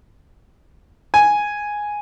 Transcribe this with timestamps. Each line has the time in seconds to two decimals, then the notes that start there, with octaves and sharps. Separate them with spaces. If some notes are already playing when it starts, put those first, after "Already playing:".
1.14 G#5